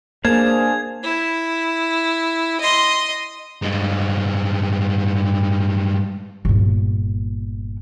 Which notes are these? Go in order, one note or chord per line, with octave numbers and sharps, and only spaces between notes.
A#3 D4 G#4 C5 F5 A5 G#6
E4
D#5 C6
G2 G#3
G1 A#2